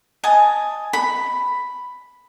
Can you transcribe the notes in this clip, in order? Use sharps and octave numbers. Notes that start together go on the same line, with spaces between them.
D#5 G#5 A5 D#6
B5